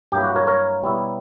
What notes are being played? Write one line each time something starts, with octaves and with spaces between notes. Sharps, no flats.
G2 F#3 A#3 E4 G4
F#4
A#4 C#5
A#4 C#5
B2 G3 B3 E4